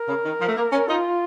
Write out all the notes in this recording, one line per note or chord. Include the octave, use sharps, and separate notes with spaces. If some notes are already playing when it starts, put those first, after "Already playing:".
Already playing: A#4
C#3
D#3
F3
A3
A#3
C#4
D#4 F4